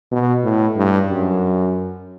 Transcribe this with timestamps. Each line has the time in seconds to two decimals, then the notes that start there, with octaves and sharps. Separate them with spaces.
0.12 B2
0.44 A2
0.77 G2
1.09 F#2